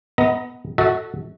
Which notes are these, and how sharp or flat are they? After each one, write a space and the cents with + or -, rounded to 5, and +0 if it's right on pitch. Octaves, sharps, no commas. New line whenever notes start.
B3 +0 D#5 +30 A#5 +0
F#4 +0 A4 +0 E5 -40